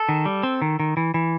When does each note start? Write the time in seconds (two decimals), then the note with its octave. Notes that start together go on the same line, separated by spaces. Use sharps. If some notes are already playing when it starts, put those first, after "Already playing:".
Already playing: A4
0.09 D#3
0.25 G3
0.43 C4
0.62 D#3
0.80 D#3
0.97 E3
1.14 E3